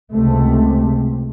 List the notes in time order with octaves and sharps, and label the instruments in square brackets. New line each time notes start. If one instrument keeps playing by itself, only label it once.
[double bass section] C#2 C3 A3